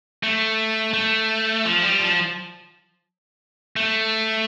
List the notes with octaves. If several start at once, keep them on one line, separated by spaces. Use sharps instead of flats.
A3
A3
F3
G3
F3
A3